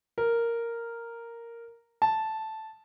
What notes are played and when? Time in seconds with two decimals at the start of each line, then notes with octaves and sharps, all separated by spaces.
0.18 A#4
2.02 A5